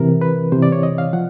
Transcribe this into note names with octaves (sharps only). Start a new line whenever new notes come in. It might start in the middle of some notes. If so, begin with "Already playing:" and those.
Already playing: C3 E3 A#4
B4
C3 E3 C5
D5
C#5
D#5
F5
F3 F#5